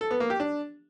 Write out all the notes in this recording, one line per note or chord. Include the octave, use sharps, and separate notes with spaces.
A4
B3
A#3
G4
D4